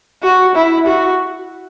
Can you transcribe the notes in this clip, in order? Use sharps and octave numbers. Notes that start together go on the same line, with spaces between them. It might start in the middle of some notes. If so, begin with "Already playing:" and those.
F#4
E4
F#4